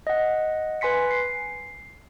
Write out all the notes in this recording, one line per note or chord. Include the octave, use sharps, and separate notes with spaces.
D#5 F#5
B4 G#5 C6 B6 C#7
C7